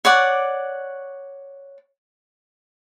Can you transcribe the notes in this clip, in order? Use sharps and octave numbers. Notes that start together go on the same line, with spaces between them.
C#5 D5 F#5 D6